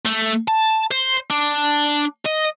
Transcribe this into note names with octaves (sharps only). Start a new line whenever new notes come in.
A3
A5
C5
D4
D#5